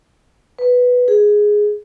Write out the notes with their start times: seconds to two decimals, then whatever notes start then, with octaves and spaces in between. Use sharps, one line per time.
0.59 B4
1.08 G#4